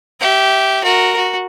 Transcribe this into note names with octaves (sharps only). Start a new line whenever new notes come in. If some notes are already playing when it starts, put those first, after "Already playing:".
G4 E5
F#4 A#4
F#4